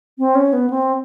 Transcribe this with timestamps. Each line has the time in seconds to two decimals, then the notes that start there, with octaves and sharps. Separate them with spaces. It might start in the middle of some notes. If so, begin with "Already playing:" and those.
0.19 C4
0.35 C#4
0.53 B3
0.70 C4